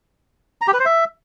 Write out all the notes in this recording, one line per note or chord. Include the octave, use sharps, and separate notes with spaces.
A#5
G4
B4
C5
E5